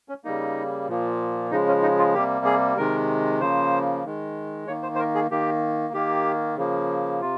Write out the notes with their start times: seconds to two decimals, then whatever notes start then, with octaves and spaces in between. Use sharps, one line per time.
0.09 C#4
0.24 C#3 G3 A#3 D#4
0.88 A#2 F3 A#3
1.51 C#3 F3 G#3 D#4
1.67 C#4
1.82 D#4
1.98 F4
2.14 C3 G3 A#3 G4
2.45 G#4
2.77 C3 D#3 G#3 A#4
3.40 C#3 F3 A#3 C5
4.05 D#3 G#3
4.67 D#3 A#3 C#5
4.83 C5
4.95 C5
4.99 A#4
5.15 G#4
5.31 D#3 A#3 G4
5.94 D#3 A#3 G4
6.57 C#3 F3 A#3
7.21 C3 F4